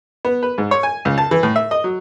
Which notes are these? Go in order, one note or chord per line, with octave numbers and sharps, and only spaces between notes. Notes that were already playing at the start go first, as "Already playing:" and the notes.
B3
B4
G#2
C#5
G#5
C#2
A5
E3
A2
E5
D#5
F#3